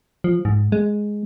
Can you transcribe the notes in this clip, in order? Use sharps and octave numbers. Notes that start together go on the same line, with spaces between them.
F3
G#2
G#3